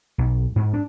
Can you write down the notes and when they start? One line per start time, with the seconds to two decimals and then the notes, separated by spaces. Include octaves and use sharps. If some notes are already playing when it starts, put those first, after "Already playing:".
0.18 B1
0.56 G#2
0.73 D4